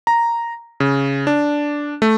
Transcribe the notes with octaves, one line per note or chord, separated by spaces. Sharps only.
A#5
C#3
D4
A3